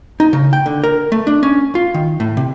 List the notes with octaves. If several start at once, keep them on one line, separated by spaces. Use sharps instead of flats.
D#4
C#3
G5
D3
A#4
A3
D4
C#4
F4
D#3
A2
C3